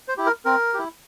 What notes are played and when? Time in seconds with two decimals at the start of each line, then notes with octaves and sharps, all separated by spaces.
0.08 C5
0.17 E4 G4
0.26 A#4
0.45 C4 A#4
0.74 E4 G4